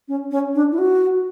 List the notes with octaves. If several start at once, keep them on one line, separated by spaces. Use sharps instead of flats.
C#4
C#4
D4
E4
F#4